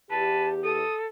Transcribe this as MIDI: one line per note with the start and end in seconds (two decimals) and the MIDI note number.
0.10 0.81 40
0.10 0.81 67
0.10 0.46 71
0.10 0.49 81
0.64 1.07 69
0.64 0.95 87